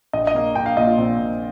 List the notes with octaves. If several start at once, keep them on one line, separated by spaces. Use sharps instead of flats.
A#1 D#5
D#5
A#2 A#3
A#1 G5
F5
A#2 A#3 D#5
F4
A#1 C4
A#2 A#3